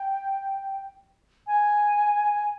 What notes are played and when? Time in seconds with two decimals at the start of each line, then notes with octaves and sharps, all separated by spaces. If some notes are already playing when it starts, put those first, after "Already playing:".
Already playing: G5
1.47 G#5